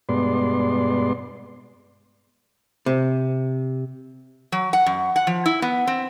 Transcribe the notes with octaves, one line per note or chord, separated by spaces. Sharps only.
G2 B2 G#3 B3 D5 C6
C3
F#3
F#5
F#2
F#5
F3
E4
B3
C4